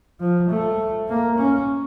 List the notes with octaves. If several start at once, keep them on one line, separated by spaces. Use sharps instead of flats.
F3
A3
A#3
C#4